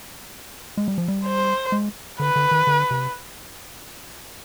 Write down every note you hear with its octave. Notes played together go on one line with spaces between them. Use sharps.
G#3
G3
F3
G3
C5
G#3
D3 B4
D3
D#3
D3
C3